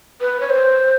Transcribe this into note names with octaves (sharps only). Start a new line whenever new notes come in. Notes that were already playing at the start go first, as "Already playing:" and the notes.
B4
C#5
C5